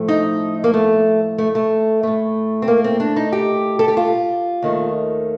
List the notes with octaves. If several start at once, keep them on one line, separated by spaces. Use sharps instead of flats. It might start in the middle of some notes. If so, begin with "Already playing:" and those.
Already playing: A2 F3 A3
D#4
A#3
A3
A3
A3
A2 A3
C4
A#3
C4
D4
D#4
G4
A4
G4
F4
D#2 D#3 A3